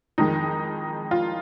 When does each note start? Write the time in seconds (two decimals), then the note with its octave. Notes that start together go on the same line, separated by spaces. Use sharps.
0.18 F2 D#3 G#3 D#4
1.11 F4